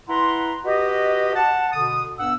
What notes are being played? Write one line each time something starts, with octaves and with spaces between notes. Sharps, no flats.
E4 B4 F#5 A#5 C6
F#4 G4 B4 D#5
F#5 A5
B2 D3 D#6
G2 B3 F#5 E6